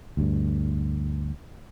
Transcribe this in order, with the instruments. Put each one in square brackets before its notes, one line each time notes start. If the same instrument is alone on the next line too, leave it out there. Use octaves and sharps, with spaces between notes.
[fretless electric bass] D2 G2